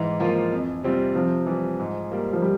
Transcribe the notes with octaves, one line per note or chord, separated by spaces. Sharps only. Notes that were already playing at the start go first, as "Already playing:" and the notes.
Already playing: G#2 E3
F3 A#3 F4
F2
C3 G3 C4 F4
C3 F3
E3 G3
G#2
G3 A#3
F3
G3